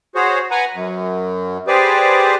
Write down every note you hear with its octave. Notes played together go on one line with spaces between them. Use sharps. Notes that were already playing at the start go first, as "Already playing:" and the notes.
F#4 G#4 C5 C#5
B4 F#5 G#5 A#5
F#2
G4 G#4 B4 C5 D5